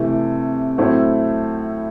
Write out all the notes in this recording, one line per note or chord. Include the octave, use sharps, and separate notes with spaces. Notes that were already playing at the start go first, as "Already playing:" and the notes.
Already playing: C3 E3 A3
A2 F#3 A3 C4 E4